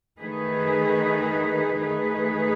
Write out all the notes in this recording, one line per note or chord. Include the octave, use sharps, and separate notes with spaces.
D#3 A3 D#4 G#4 B4
D#3 A3 D#4 G#4 B4